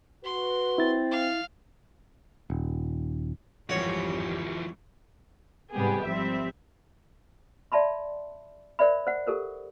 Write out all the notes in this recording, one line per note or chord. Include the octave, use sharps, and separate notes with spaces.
F#4 B4 C6
C4 E4 A6
F5
D#1
G#1 F2 E3 F3 G3 F#4 C#5
G#2 C3 G3 B3 G4 G#4
G#1 F3 G3 C4 E5
D5 E5 A5 B5 C6
A#4 C5 D5 E5 B5
C5 F#5
G4 A4 A#4 C5